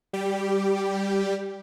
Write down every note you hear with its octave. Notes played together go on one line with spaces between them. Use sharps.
G3 G4